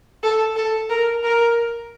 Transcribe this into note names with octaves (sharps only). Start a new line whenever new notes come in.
A4
A4
A#4
A#4